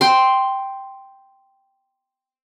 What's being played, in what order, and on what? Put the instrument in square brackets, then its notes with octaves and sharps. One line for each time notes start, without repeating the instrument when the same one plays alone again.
[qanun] G5 C6